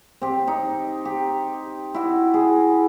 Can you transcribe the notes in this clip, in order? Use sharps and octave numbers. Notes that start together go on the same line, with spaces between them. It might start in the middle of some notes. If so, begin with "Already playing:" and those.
C4 G4
D#4
G4
E4 F#4
G#4